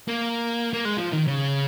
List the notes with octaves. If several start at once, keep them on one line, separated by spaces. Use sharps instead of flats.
A#3
A#3
G#3
F3
D#3
C#3